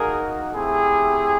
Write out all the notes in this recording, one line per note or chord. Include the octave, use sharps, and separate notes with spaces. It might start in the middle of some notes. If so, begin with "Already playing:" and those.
Already playing: A#3 D#4 F#4 G#4 A#4
A3 C4 E4 G4 G#4